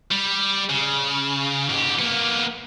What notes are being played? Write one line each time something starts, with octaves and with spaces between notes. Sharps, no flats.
G3
C#3
G#2 G4
A#3 B3